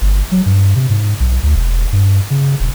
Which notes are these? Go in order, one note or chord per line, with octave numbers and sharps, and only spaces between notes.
G1
F#3
G2
C3
G#2
B1
D2
E1
G2
C#3
D#1